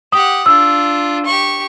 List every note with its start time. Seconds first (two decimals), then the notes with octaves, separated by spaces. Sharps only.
0.12 G4 F#5 D#6
0.46 D4 F4 E6
1.26 G4 C#6